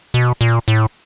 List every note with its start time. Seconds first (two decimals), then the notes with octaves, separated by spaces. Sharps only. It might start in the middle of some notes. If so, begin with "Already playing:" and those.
0.14 B2
0.41 A#2
0.68 A2